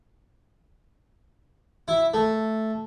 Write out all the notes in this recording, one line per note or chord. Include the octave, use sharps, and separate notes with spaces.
E4
A3